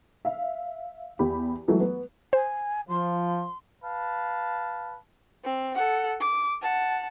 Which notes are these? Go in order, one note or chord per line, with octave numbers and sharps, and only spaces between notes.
E5 F5
E2 G4 B5
E3 F#3 G#3 A3
B3
C5 G#5
F3 C6
B4 F5 A5
C4
A4 F#5
D6
F#5 A5